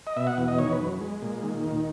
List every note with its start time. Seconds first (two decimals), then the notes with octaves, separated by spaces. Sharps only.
0.07 D#5
0.16 B2 E5
0.27 F#5
0.38 E2
0.48 D#5
0.58 D#3 C#5
0.72 B4
0.80 F#2
1.01 G#3
1.22 A#2
1.43 D#3
1.64 D#2